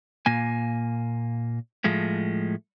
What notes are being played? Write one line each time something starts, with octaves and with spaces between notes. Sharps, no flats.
A#2 A#3 G#5
A2 F3 G#3 A3